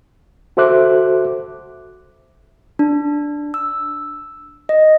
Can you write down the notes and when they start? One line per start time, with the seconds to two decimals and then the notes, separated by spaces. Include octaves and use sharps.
0.57 F#4 A4 C5 E5 D6 F#6
2.79 D4
3.54 E6
4.69 D#5